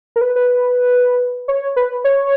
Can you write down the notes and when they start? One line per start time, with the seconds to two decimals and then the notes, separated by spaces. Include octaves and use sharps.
0.16 A#4
0.21 B4
0.36 B4
1.48 C#5
1.76 B4
2.04 C#5